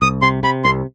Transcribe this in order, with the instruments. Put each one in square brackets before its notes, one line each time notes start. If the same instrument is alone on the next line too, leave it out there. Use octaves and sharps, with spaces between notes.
[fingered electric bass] C2 [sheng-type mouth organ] D#6
[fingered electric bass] C3 [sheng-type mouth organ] C6
[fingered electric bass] C3 [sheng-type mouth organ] B5
[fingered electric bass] C2 [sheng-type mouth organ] C6